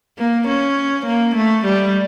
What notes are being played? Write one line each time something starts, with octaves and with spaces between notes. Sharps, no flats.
A#3
C#4
A#3
A3
G3